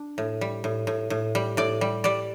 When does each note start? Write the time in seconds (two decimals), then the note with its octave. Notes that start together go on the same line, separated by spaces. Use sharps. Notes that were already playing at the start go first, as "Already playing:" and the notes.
Already playing: D4
0.18 A2
0.41 G3
0.64 A2
0.87 A2
1.10 A2
1.35 G3
1.57 A2 D5
1.81 G3
2.04 G3 D5